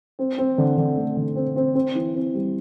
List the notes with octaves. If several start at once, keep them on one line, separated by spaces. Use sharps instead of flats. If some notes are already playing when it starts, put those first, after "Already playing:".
C4
C4
D3
D3
A3
D3
C4
C4
C4
E3
C4
G3